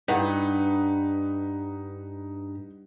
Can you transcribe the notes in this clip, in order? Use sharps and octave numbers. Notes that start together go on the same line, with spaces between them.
G2 D#4 B4 F#5